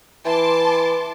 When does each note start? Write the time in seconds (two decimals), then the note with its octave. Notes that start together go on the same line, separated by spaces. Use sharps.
0.25 E3 A5 C6 D6